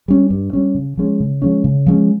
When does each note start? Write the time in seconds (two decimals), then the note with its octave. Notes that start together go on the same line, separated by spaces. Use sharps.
0.08 G3 C#4
0.30 G2
0.53 G3 C#4
0.75 C#3
0.97 F3 G#3 C#4
1.20 C#3
1.42 F3 G#3 C#4
1.64 C#3
1.86 F3 G#3 C#4